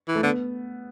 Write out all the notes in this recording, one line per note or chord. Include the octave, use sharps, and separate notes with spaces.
E3
A3
D3 B3